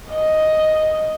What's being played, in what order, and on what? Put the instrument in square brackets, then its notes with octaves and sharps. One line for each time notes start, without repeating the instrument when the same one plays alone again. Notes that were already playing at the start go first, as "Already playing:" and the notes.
[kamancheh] D#5